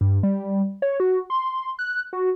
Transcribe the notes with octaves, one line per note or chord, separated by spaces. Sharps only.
G2
G3
C#5
F#4
C6
F#6
F#4